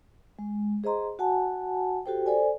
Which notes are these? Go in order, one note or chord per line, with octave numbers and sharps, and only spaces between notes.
G#3
G#4 C5 D#5 A#5 C6
F#4 F#5 G#5 A5
F#4 G4 A4 C5 G5
A4 C5 D5 G#5